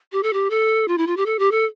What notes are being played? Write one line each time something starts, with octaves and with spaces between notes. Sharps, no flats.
G4
A4
G4
A4
F4
E4
F4
G4
A4
G4
A4